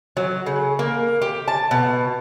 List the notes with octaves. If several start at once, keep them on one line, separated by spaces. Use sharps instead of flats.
F#3
C#3
A#3
G4
A5
B2